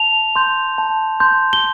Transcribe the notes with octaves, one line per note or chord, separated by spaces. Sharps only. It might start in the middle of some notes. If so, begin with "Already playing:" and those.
Already playing: A5 F7
C6 G6
A5
C6 G6
G7